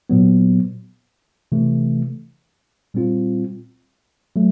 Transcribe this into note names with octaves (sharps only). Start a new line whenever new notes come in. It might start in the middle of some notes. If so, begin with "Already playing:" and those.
A#2 F#3 B3
C3 E3 A3
A#2 G3 C4 F4
F#3 A3